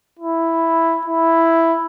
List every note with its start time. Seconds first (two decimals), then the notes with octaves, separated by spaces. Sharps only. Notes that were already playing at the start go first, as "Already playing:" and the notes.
0.19 E4
1.06 E4